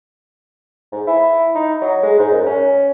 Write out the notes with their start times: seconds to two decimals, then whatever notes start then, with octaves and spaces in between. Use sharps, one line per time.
0.92 G#2
1.07 E4
1.55 D#4
1.82 F#3
2.03 G#3
2.19 G#2
2.31 F#2
2.46 C#4